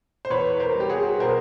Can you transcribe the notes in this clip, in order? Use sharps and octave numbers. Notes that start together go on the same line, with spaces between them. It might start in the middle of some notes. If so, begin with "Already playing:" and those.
C5
E2 B4 C#5
A#4 C5
G3
G4
F#4 G#4
B2 A#4 C5